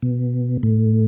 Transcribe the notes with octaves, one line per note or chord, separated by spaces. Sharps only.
B2
A2